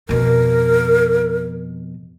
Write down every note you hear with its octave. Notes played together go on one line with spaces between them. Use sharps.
F2 B2 A#4